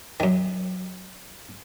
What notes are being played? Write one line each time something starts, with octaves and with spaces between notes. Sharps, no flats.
F#2 D#3